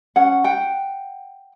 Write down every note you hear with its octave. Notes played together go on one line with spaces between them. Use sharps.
C#4 F#5
F#5 G5